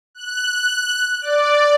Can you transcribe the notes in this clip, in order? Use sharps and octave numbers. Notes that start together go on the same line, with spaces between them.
F#6
D5